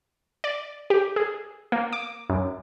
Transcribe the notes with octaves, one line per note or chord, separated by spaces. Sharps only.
D5
G4
G#4
A#3
D6
F#2